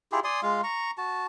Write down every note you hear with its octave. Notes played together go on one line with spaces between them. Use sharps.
E4 F4 G4 G#4
D5 G#5 C6 D#6
G#3 F4 F5
A#5 C#6
F#4 A5